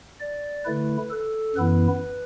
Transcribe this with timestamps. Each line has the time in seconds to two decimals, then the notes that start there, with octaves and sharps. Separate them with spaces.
0.20 D5
0.65 D3 A3 E4 B4
1.10 A4
1.56 F#2 E3 B3 E4 B4